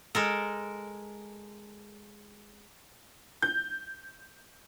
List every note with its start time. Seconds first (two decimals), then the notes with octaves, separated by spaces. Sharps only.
0.15 G#3 A4 A#4
3.42 G6